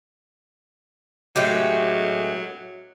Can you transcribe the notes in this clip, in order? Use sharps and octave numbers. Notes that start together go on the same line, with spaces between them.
A2 F#3 G#3 G4